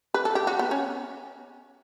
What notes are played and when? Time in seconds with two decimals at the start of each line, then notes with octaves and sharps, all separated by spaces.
0.14 B4
0.25 A4
0.35 G4
0.47 F#4
0.59 B3
0.71 C#4